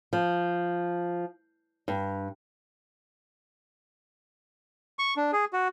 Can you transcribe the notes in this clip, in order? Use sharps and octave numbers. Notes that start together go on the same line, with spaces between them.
F3
G2
C#6
D4
G#4
F#4